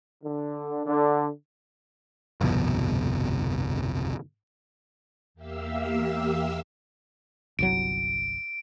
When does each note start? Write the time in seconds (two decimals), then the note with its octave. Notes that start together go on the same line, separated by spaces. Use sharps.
0.24 D3
0.87 D3
2.41 G1 C2 F2 B2
5.34 E2 A#3 G4 E5 F5 E6
7.59 G1 C2 F#3 D7